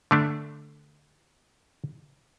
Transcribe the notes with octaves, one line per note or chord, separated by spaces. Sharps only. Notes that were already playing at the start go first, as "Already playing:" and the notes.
D3 A3 D4